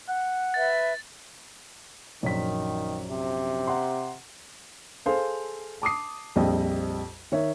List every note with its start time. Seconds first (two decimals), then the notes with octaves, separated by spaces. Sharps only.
0.08 F#5
0.54 B4 E5 A6
2.23 A#1 F#2 D#3 B6
3.11 C3
3.67 F#5 A#5 C6
5.06 G#4 A4 C5 F5
5.82 A5 D6 D#6 C7
6.36 A#1 F2 G3 D#5 G5
7.32 D#3 C#5 E5